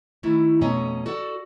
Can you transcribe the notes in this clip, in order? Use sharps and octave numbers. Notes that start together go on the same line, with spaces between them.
D#3 A3 E4
F2 B2 A3 C#4 D#5 A#5
F#4 A4 D5